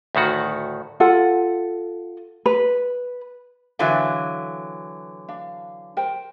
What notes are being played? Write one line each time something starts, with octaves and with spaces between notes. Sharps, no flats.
D2 A2 D#3 F#4
F4 A4 F#5
B4
D3 E3 F#3 B4 E5 F5
D4 F5
A#4 C5 G5